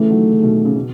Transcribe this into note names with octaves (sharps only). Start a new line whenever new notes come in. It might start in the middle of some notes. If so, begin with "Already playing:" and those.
Already playing: C#3 E3 A3
D#3 F#3
D#3 F#3
B2 D#3
C#3
B2